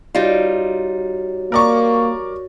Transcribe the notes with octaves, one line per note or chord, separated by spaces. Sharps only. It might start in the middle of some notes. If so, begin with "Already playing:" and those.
G3 D#4 F4 F#4 C#5
A#3 A#4 D5 C#6